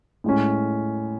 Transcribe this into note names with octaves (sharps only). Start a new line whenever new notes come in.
A2 G#3 C#4